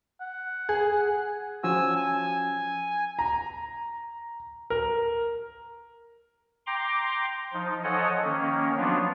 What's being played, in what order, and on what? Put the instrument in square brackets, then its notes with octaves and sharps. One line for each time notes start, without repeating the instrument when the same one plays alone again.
[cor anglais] F#5
[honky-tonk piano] G#4
[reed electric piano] F3 C#4 F#4 [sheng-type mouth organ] G#5 E6
[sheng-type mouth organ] G#5
[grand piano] A#5
A#4
[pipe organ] G5 A#5 C6 D6
F3 D#4
F3 A4 C#5 D#5 F#5 G#5
D#3 A#3 C#4
F3 F#3 B3 D4 F4